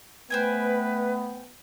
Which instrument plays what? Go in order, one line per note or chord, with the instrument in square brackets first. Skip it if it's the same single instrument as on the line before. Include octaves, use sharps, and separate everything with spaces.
[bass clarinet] A3 [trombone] B3 [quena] B4 [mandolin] C5 G5 G#5